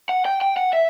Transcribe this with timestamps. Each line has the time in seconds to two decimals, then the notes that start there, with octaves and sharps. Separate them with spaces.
0.09 F#5
0.25 G5
0.41 G5
0.57 F#5
0.73 E5